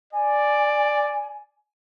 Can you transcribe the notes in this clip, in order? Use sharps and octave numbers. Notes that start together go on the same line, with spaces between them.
D5 G#5